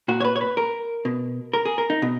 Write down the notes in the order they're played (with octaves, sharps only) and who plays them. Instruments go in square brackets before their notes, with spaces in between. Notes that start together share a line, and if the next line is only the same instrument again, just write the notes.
[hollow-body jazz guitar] A#2 F#4
C#5
B4
C#5
B4
A#4
B2
A#4
G#4
A#4
D#4
B2